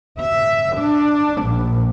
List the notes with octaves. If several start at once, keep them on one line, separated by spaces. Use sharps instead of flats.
E5
D4
A#1